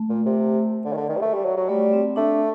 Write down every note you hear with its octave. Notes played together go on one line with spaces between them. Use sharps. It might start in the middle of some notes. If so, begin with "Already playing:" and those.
Already playing: A3
A#2
C3
D3
D#3
D3
D#3
G3
A3
G3
F#3
F#3
G3 A3
C4
A3 D4